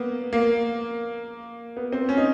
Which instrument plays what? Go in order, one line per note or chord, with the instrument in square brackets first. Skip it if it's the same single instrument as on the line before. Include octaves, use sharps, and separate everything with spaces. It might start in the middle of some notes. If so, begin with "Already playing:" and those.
Already playing: [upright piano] A#3 B3
A#3
B3
C4
C#4
D#4